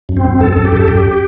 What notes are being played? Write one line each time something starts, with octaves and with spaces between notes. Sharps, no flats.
F#2
C4
F#2
F#2 A4
F#2 A4
G4
F#2 A4
F#2 G4